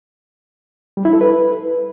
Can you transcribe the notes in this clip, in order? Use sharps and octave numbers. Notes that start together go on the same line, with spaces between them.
G3
E4
A4
B4